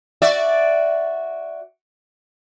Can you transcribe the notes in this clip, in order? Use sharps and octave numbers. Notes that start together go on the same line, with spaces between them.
F#4 D5 E5